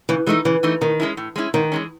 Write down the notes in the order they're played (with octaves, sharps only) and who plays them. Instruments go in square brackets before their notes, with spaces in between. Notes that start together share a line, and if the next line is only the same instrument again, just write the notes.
[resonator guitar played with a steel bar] C#3 [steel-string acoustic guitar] E3
[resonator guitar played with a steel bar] E3 A3 D#4 [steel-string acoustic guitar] G#3
[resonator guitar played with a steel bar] C#3 [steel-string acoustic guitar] E3
[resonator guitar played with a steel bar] E3 A3 D#4
[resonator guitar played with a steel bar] A2 [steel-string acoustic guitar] D#3
[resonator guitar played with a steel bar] G#3 C#4 E4
A2
G#3 C#4 E4
[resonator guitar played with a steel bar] G#2 [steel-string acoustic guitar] D#3
[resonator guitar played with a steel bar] E3 G#3 C#4